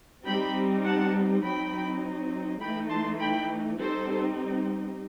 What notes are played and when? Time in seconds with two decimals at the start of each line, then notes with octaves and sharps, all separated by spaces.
0.25 G3 C4 D#4 G5 B5
0.84 F#5 A5
1.43 F#3 C4 D#4 G5 B5
2.60 E3 A3 D#4 G5 B5
2.90 A5 C6
3.19 G5 B5
3.78 G3 C4 D#4 A4 C5